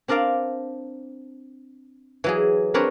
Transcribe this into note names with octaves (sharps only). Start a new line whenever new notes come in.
C4 D4 A#4 D5 F5
E3 F#3 G#4
C4 D4 A#4 B4 C#5